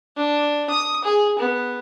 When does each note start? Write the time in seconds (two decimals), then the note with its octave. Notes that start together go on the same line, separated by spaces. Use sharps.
0.16 D4
0.70 D#6
1.04 G#4
1.39 B3